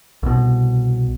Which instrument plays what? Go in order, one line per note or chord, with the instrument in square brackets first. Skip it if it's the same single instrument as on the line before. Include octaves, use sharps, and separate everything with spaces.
[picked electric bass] C2 B2